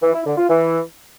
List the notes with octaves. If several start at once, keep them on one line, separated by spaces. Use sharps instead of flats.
E3
E4
D3
F4
E3